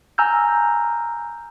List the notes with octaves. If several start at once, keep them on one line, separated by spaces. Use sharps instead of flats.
G#5 A#5 E6 F6 G6